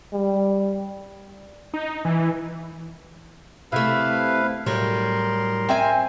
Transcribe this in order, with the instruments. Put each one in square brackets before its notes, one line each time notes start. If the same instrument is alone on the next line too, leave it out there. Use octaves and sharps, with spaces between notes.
[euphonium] G3
[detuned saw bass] D#4
E3
[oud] C3 A3 [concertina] E4 B4 F5
[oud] A2 F#3 G3 [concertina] A#4 C6
[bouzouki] C4 E5 G#5